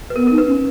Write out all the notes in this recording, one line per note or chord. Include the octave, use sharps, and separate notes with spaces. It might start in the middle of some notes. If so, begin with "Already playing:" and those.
B4
B3 A#4
D#4 A#4
B4
C#4